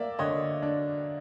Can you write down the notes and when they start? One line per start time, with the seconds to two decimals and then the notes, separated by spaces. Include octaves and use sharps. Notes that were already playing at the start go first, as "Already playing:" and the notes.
Already playing: A#3 D5 E5
0.19 D3 C#5 D#5
0.63 D4